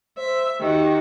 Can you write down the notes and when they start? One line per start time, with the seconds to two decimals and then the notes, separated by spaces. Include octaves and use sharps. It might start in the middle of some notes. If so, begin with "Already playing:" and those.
0.17 C5 E5
0.60 D#3 F#4 G4